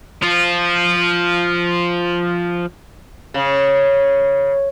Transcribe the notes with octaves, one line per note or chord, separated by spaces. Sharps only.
F3 F4
C#3